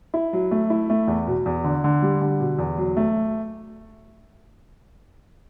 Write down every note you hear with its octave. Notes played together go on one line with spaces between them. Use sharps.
E4
F#3
A3
E4
A3
E2
B2
E2
D3
D3
G3
D3
B2
E2
F#3
A3